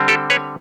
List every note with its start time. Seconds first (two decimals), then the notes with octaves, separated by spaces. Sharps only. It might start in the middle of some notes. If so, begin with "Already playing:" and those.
Already playing: D3 G3 C4
0.08 G4 A4
0.30 B4 C#5